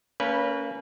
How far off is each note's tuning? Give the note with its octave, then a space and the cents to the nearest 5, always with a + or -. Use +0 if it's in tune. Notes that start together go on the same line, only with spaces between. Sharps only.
A#3 -25 C#4 +20 B4 -20